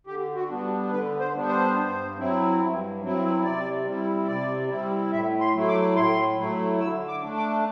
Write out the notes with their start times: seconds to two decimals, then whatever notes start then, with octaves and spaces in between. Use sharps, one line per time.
0.07 D3 G4
0.36 F#4
0.49 G3 B3 D4
0.91 D3 B4
1.20 C5
1.33 G3 B3 D4
1.48 C5
1.76 G2
2.18 F#3 C4 E4
2.60 G2
3.02 F#3 C4 E4
3.44 C3 D5
3.86 G3 C4 E4
4.27 C3 D5
4.69 G3 C4 E4
5.12 A2 E5
5.41 C6
5.54 F#3 A3 E4
5.68 D6
5.96 A2 C6
6.38 F#3 A3 E4
6.80 D3 E6
7.08 D6
7.23 A3 D4
7.37 D6